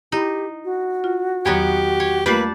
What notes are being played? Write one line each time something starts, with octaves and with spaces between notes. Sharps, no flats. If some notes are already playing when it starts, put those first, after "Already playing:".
D#4 E4 G4 B5
F#4
F4
E2 D#3 F#3 B3 G4 C#5
C#5
G3 A3 A#3 D4 F4 G4 B4 A5